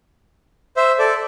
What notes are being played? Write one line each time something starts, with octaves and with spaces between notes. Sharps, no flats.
C5 E5
A4 D5